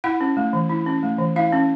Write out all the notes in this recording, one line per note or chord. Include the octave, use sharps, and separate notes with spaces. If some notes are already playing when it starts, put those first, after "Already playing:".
E4 F#5
C#4
A3
E3
E4
C#4
A3
E3
E4 F5
C#4